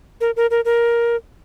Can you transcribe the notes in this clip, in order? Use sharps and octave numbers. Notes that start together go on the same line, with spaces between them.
A#4
A#4
A#4
A#4